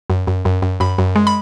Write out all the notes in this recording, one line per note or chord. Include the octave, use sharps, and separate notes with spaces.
F#2
F#2
F#2
F#2
F#2 B5
F#2
G#3
B5